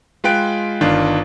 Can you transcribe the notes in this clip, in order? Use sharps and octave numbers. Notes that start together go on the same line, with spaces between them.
G#3 F4 B4 G5 F#6 D7
G1 D#3 D4 F4